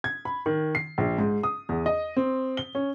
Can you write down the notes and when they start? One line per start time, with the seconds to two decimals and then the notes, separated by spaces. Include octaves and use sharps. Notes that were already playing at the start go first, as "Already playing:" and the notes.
0.04 G#6
0.25 B5
0.46 D#3
0.75 C7
0.98 A#1
1.18 G#2
1.43 D#6
1.69 E2
1.86 D#5
2.16 C4
2.57 G7
2.75 C#4